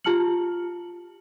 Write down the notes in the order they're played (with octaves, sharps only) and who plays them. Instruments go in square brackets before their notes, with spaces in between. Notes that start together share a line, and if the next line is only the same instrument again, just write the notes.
[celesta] F4 G4 A5 F6 C#7 F#7